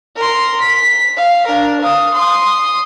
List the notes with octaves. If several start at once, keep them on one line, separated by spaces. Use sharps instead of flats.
A#4 C6
B6
F5
D4 A#4
F5 D#6
C6 D#6